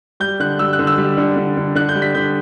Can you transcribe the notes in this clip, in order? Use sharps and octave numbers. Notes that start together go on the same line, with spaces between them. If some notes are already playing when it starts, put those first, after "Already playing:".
G3 G6
D3 F#6
G3 E6
F#6
D3
E6
G3
D3
D3
D3
D3 F#6
G6
G3
B6
D3 G6